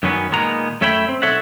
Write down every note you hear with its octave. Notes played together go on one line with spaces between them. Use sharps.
F#2 D#3 F#3 B3 C#4
A#2 D#3 G#3 B3 A#5
F#2 A3 C#5 E5 G5 B5
C4
B1 A4 C#5 E5 F#5